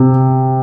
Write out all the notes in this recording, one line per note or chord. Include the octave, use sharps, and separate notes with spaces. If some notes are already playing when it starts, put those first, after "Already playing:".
Already playing: C3